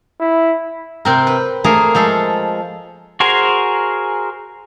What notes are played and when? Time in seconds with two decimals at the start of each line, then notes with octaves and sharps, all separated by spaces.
0.20 E4
1.05 C3 C4 A#4
1.27 B4
1.64 A3 A#3 G#4 A#4
1.95 F3 G#3 A4
3.20 F#4 G#4 A#4 C5 G#5